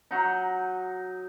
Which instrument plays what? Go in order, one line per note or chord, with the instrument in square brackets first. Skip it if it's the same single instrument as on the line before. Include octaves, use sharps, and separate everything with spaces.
[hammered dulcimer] F#3 D#4